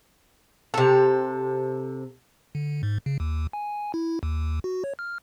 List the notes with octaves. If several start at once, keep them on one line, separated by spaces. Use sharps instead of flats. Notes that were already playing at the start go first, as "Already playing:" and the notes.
C3 A4
D3
G#2
C#3
D#2
G#5
E4
D#2
F#4
C#5
F6